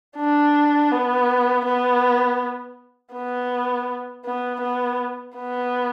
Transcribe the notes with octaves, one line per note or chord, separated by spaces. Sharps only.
D4
B3
B3
B3
B3
B3
B3